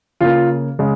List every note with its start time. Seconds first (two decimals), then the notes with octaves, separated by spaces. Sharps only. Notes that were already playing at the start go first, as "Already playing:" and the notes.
0.21 C#3 A#3 F4
0.79 C#3 G#3